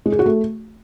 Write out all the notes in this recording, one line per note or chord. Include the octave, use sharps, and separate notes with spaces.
G#3
G#4
F#4
A3